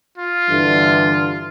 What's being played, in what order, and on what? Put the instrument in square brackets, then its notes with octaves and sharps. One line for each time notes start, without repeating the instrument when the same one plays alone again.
[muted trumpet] F4
[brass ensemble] G2 D3 E3